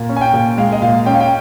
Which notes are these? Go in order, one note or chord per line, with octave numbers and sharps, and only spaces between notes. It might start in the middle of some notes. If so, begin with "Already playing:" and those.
Already playing: A#2
C#4
G#5
G5
A#2
G#3 F5
D#5
A#2 F5
C#4 G5
F5
G5